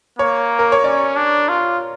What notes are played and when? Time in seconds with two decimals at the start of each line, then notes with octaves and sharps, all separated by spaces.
0.19 A#3 C#5
0.59 A#4
0.72 C#5
0.84 C#4 D5
1.16 D4
1.49 F4